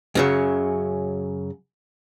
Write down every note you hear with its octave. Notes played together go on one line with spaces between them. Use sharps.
F#2 C#3 F#3